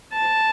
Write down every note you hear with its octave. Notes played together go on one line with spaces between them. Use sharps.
A5